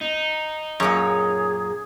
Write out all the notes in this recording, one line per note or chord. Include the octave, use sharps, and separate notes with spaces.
D#4
F#2 A#2 G#4 C#5 D6